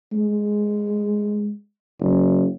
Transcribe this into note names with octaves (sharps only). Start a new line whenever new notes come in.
G#3
F#1